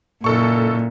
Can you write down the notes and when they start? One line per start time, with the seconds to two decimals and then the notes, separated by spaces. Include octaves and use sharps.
0.24 F#1 A#2 A4 C#6